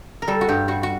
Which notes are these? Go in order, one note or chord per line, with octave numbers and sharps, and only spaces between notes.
A#4
G3 A4
F#4
G2 G4
G3 F#4
F#4